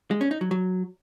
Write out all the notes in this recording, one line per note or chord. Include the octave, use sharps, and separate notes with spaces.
G#3
C#4
D#4
F#3
F#3